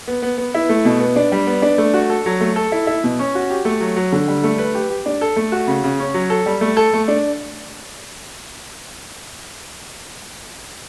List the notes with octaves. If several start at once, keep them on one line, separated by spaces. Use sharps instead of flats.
B3
B3
B3
E4
A3
B2
B3
D4
G3
B3
D4
A3
F#4
A4
F#3
A3
A4
E4
E4
B2
C#4
F#4
G4
A3
F#3
F#3
D3
G3
A3
B4
G4
G4
D4
A4
A3
F#4
C#3
C#3
C#4
F#3
A4
G3
A3
A4
A3
D4